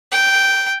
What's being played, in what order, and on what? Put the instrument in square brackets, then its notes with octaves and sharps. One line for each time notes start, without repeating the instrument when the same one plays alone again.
[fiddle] G5